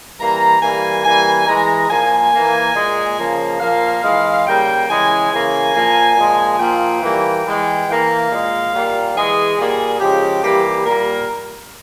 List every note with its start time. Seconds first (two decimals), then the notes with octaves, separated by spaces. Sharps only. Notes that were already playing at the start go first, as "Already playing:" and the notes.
0.19 E3 G3 A#3 A#5
0.61 E3 G3 A#3 G#5
1.05 E3 G3 A#3 G#5
1.47 E3 G#3 A#5
1.90 A#2 F3 A#3 G#5
2.32 E3 A#3
2.75 A#2 G#3
3.18 C#3 F3 A#3
3.60 A#2 F3 A#3 F5
4.03 E3 G#3
4.46 C#3 G3 A#3 G5
4.88 C#3 E3 G#3 G#5
5.31 C#3 E3 A#3 G#5
5.75 A#2 F3 A#3
6.16 A#2 F3 G#3
6.59 A#2 F3 A#3 G5
7.01 E3 G3 A#3
7.45 E3 G#3
7.88 E3 A#3 F5
8.30 A#2 G#3
8.73 A#2 G3 A#3
9.15 E3 G#3 G#4
9.58 A#2 G3 A#3 G#4
10.00 C#3 F3 G#3 G4
10.43 E3 G3 A#3 G4
10.85 A#2 G3 A#3 A#4